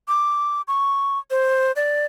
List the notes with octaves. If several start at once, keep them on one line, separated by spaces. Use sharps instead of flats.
D6
C#6
C5
D5